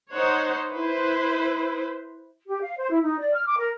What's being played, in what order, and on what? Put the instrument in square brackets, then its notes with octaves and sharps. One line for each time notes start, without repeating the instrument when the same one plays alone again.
[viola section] D#4 C5 C#5 F#5
E4 B4 C5
[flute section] G4
F5
C5
E4
D#4
D5
F6
D6
A#4